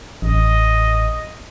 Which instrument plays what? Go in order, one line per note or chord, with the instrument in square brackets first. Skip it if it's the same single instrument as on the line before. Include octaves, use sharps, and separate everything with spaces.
[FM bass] A1 [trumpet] D#5